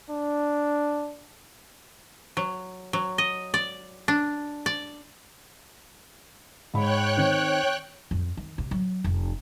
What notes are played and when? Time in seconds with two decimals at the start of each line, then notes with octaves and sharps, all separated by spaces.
0.10 D4
2.37 F#3
2.93 F#3
3.18 D#5
3.54 D5
4.08 D4
4.66 D5
6.74 G#2 C#5 G5 B5 F#6
7.17 D#3 C4
8.11 F2
8.37 D#3
8.58 C3
8.71 F#3
9.04 F1